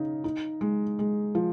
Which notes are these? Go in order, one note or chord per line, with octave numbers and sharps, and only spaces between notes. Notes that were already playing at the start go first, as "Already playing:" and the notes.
Already playing: C#3 D#4
D#4
G#3
G#3
F3